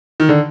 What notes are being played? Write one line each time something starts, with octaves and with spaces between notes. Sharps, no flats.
D#3
D3